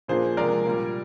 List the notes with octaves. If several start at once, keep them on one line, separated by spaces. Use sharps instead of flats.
A#2 F3 A#3 D4 G#4 C5
C3 F3 G#3 A#4 D5
A#2 G3 A#3